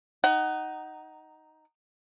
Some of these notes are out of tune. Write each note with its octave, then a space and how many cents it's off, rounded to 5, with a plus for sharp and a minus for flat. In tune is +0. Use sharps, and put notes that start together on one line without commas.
D#4 +0 F#5 +20